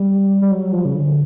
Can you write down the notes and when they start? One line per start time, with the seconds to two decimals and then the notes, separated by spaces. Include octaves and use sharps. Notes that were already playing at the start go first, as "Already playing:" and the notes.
Already playing: G3
0.42 G3
0.52 F#3
0.72 F3
0.85 C#3
0.94 D3